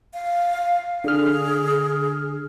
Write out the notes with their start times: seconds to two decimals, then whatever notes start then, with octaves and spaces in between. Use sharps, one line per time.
0.14 F5
1.04 D3 G#4 F6